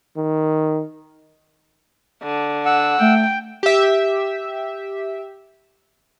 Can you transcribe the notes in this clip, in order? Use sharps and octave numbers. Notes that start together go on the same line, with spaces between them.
D#3
D3
F#5 E6
A3 G5
G4 E5